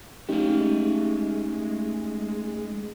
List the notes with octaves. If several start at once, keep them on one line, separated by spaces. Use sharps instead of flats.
G#3 A3 C#4 D#4 G4 F5